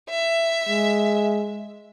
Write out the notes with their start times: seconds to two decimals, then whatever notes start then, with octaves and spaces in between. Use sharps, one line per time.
0.10 E5
0.68 G#3